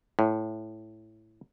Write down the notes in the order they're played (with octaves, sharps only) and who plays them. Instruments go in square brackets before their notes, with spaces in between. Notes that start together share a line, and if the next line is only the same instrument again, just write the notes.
[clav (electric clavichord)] A2